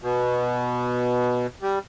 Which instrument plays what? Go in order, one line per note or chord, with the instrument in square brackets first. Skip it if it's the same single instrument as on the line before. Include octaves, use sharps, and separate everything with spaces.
[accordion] B2
G3